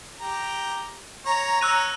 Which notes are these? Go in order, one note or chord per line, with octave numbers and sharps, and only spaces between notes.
G4 A#5
C#5 A#5
C#5 E6 F#6 D#7